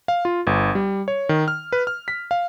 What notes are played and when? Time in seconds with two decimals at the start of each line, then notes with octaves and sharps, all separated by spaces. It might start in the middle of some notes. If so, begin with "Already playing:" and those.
0.08 F5
0.25 F4
0.47 G1
0.75 G3
1.08 C#5
1.29 D#3
1.48 F6
1.73 B4
1.87 F6
2.08 B6
2.31 F5